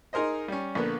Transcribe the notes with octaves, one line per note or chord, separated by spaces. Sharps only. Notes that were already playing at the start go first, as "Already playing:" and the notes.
D#4 G#4 A#4 C5 D#5
G3 C#4
A#1 D3 A#3 B3